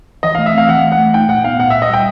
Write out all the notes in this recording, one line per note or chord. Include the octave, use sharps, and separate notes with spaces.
E3 D#5
A3 F5
E5
C4 F5
E3 F#5
A3
F#5
A3
D#4 G5
A#2 F#5
B3 F5
A#2 F#5
A#2 E5
D#5
G3 G5